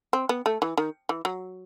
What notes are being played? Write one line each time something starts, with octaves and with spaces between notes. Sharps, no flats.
C4
B3
A3
E3
D#3
E3
F#3